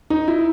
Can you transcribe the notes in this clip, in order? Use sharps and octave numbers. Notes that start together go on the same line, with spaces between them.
D#4
E4